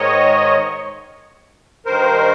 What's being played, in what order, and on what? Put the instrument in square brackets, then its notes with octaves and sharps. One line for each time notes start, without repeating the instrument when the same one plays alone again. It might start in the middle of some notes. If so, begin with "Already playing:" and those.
Already playing: [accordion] G#2 D#3 C#5 D#5
G2 D#3 A#4 C5